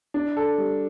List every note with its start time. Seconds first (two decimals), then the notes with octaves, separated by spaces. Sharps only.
0.14 D4
0.37 A4
0.58 G3